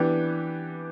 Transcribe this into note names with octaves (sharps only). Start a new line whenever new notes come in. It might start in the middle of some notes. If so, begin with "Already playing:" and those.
Already playing: E3 B3 D4 G4